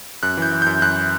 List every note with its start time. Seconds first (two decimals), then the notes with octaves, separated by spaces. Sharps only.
0.23 F#2 F#6
0.37 E3 G6
0.52 E3
0.62 F#2 G6
0.82 F#2 F#6